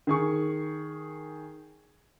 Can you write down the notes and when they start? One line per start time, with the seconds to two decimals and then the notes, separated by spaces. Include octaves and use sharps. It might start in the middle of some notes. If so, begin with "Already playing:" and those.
0.07 D#3 G#4 C#6